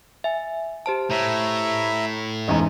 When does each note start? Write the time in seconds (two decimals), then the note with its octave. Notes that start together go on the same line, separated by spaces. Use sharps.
0.24 E5 G#5
0.86 G4 C5 A5
1.11 A2 E5 A#5
2.48 A1 E2 G#2 D#5 A#5